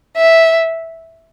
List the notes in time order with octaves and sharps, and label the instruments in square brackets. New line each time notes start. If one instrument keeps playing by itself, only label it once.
[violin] E5